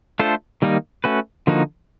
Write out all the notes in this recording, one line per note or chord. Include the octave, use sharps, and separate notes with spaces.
A3 D4 F4 A4 C5
D#3 G3 A#3 D#4
A3 C#4 F#4 B4
D3 F3 A#3 D#4 F#4